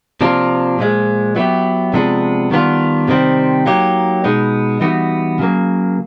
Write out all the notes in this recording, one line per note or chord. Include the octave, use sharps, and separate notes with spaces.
C3 F3 A#3 D4 F4
A#2 F3 G#3
F#3 B3 E4 G4
C3 F3 G#3 B3 D4
D#3 G3 B3 D4 F4
C3 D#3 G3 C4
F#3 A#3 D#4 G4
B2 G#3 B3 D#4
E3 G3 B3 D#4 F#4
C#3 F#3 A#3